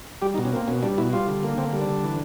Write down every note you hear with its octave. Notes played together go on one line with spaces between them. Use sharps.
G3 G4
D#4
B2
C#4
A#3 C4
B2 C#4
G3 D4
B2 E4
G3 F4
D3
A#3
D3 C4
G3
D4
D3
E3